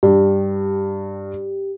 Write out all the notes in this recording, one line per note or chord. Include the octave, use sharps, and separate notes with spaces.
G2 G4